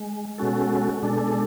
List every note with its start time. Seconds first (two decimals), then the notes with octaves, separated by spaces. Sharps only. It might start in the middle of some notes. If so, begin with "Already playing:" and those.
Already playing: G#3
0.38 B2 G#3 C#4 F#4 A4
1.03 B2 G#3 D4 A4